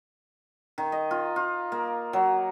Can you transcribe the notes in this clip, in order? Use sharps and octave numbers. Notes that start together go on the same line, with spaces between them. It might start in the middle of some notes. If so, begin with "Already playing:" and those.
D#3
D#5
F4
F4
A#3
F#3